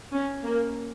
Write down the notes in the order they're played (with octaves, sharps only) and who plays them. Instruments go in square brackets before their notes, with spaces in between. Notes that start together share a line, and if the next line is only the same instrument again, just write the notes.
[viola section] C#4
A#3